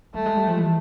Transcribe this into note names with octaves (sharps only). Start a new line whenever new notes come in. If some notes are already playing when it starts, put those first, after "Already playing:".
G3 A3
G#3
G3
F3
E3